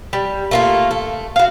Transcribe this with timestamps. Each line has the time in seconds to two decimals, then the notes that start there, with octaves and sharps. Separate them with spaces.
0.13 G3
0.51 A3 A#3 F4
0.91 A3
1.36 F#4 F5